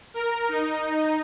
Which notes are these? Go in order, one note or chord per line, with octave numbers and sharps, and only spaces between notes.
A#4
D#4